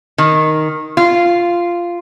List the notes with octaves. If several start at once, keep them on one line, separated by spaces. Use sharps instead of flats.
D#3
F4